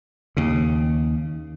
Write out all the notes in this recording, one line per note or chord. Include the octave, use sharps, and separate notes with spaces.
D#2 C#3